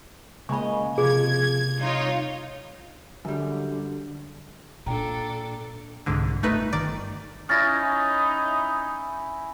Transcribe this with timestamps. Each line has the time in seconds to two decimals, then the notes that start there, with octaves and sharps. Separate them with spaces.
0.49 C#3 G#3 A#3 D#5 B5 C#6
0.98 C3 F3 G#4 G#6
1.79 G3 D#4 F4 C#5
3.25 F#2 D3 G3
4.86 A#2 D4 A4 G5 A#5
6.06 C2 G#2 D3
6.43 G1 A3 D#4 B4
6.73 G1 D#3 D5
7.49 C#4 D#4 E4 D#5 F6 A6 A#6